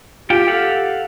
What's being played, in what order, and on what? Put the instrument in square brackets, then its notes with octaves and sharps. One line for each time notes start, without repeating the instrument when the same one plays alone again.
[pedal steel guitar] F4 G5 [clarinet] G4
[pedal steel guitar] A4 F5 F#5